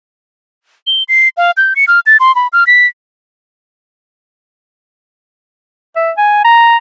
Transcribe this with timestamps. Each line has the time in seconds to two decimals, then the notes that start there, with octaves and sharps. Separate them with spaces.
0.87 G7
1.09 C7
1.37 F5
1.57 G6
1.76 C#7
1.88 F6
2.06 A6
2.20 C6
2.35 B5
2.53 F6
2.67 B6
5.96 E5
6.17 G#5
6.44 A#5